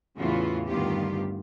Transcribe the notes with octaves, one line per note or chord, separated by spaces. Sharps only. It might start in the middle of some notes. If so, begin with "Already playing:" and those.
E2 A2 C#3 E3 F4 F#4
D2 G2 D#3 B3 F4 G4